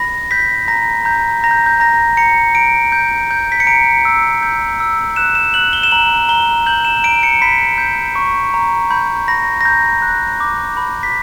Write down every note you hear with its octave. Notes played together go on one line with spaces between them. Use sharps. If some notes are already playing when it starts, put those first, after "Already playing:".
Already playing: B5 A#6
G6 B6
A#5 A#6
A#5 G6
A#5 A#6
G6
G6
A#5 A#6
A#5 C#7
A#5 D7
G6
G6
B6
C#7
A#5 D7
E6
G6
E6
F#6 E7
E7
F#6 F#7
G7
E7
A#5 F#7
A#5 G7
G6 F#7
E7
A#5 D7
C#7
B5 B6
G6
C#6
A#5
B5 G6
B5 A#6
A#6
A#5 G6
F#6
D6
B5
B6